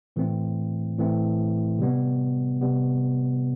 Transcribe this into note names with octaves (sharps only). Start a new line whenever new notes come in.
A2 E3 A3 C4
A2 E3 A3 C4
C3 G3 B3
C3 G3 B3